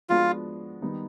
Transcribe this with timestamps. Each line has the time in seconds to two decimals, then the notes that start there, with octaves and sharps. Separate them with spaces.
0.09 F3 G#3 B3 D4 F4 F#4
0.82 D#3 G3 B3 D#4